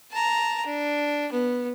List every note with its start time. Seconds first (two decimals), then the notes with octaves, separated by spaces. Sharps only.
0.11 A5 A#5
0.66 D4
1.32 B3